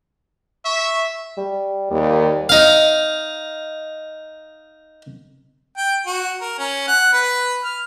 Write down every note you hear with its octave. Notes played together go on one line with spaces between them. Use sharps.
E5 C#6
G3
D#2 G3
D#4 F5
G5
F#4
A#4
C#4
F#5
B4
F6